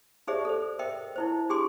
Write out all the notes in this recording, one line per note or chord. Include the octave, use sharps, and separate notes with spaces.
D#4 G4 G#4 C5 D5 E5
A4 C5
A#4 C5 D#5 E5 G5
D#4 E4 C5
D4 G4 G#4 G#5 C6 D6